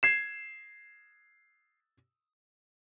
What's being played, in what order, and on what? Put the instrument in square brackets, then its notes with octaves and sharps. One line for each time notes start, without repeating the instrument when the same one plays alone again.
[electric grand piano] G#6 C7 E7